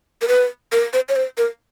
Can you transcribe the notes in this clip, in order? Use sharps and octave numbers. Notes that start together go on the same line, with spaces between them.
A#4
B4
A#4
C5
C#5
C5
A#4